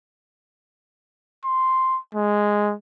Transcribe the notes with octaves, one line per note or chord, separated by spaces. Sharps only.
C6
G#3